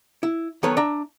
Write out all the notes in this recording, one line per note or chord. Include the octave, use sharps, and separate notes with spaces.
E4
D#3 F#3 B3 A4 B4 C#5
D4 E5 A#5